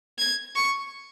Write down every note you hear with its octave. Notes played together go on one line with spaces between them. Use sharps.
G#6
C#6